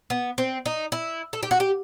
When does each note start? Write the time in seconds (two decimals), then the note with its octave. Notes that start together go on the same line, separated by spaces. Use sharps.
0.10 B3
0.38 C4
0.66 D#4
0.92 E4
1.33 A4
1.43 G4
1.51 F#4
1.60 G4